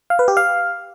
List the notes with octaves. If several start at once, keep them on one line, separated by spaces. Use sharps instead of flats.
F5
B4
G4
F5